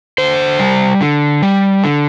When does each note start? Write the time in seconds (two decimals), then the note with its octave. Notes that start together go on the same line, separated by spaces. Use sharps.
0.18 D3 C5
0.60 G3
1.01 D3
1.42 G3
1.84 D3